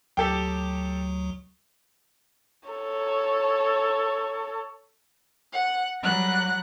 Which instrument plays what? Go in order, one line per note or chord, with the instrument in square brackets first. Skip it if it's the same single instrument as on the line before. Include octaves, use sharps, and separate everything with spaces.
[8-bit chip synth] D2 F#3 [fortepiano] G4 A4 G5
[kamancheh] A4 C#5
[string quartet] F#5
F#3 G3 F#5 F#6 A#6